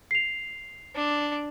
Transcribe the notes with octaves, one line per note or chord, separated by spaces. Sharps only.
C7 F7
D4